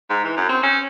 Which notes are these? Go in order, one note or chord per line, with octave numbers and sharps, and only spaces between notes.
G#2
E3
F#2
C4
C#4